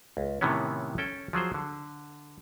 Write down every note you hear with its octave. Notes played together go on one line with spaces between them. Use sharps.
C#2
A2 C3 D#3 E3 B3 C#4
C#4 A4 G5
F3 F#3 G#4 C5
D3